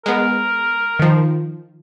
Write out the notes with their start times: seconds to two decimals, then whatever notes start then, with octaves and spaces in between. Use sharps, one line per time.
0.06 G#3 B3 A#4
0.99 D#3 F3